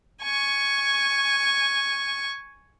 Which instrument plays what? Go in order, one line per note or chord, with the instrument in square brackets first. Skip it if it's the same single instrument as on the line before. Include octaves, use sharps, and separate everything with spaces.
[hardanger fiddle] G#5 C#6